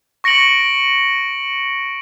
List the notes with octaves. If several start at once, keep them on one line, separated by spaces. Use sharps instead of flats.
C#6 A#6 C#7 D7 F#7